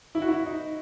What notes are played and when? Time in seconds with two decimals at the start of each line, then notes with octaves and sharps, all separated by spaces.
0.15 E4
0.22 F#4
0.28 E4
0.46 D#4